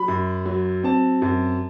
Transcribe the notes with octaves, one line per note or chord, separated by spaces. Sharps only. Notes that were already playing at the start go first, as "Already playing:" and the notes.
Already playing: F#3 B5
F#2
F#3
C4 A5
F#2